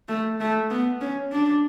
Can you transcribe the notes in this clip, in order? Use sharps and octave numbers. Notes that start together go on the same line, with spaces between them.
A3
A3
B3
C#4
D4